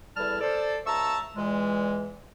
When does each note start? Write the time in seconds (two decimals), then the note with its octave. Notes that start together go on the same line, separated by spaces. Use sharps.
0.17 E2 G3 E4 A4 A5 F6
0.41 A4 C5 D5
0.86 C#2 E5 A5 A#5 C#6 E6
1.36 E2 A#2 E3 G#3